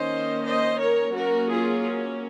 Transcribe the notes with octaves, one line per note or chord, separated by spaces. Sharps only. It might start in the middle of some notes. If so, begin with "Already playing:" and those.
Already playing: D#3 A#3 C#4 C5 D#5
C5 D#5
A#4 C#5
F#3 A#3 C#4 F#4 A#4
F4 G#4